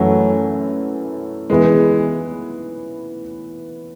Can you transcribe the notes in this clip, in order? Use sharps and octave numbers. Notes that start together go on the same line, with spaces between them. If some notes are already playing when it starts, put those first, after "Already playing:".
Already playing: F#2 E3 F#3 A3
E3 G#3 B3 E4 B4